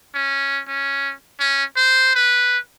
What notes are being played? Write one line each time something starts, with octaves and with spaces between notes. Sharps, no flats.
C#4
C#4
C#4
C5
B4